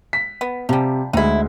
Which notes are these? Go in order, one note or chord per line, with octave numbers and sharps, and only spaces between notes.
B6
B3
C3 F3 G3
D2 G#3 D#4 E4